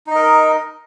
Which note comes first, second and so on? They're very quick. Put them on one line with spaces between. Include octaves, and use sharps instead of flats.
D#4 D#5 A#4